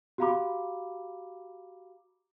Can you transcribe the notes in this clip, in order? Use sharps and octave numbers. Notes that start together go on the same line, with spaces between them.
F#4 G4 F5 A#5 B5 D6